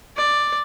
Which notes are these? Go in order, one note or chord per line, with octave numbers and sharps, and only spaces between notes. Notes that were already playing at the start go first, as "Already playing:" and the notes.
D5